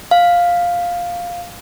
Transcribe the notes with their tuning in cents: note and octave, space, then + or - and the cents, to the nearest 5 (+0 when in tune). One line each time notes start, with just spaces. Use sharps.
F5 +5